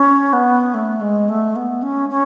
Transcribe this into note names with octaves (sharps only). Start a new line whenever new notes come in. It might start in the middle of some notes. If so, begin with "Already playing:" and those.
Already playing: C#4
B3
A3
G#3
A3
B3
C#4
C#4